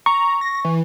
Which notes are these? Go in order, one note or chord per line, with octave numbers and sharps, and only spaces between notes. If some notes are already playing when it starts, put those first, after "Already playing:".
A#5 C#6
A#6
E3